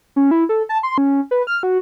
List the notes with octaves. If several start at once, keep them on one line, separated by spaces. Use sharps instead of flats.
C#4
E4
A4
A5
C6
C#4
B4
F6
F#4